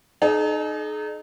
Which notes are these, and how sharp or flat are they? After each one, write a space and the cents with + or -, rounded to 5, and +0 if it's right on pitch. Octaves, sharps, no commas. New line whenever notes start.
D#4 -25 G#4 +45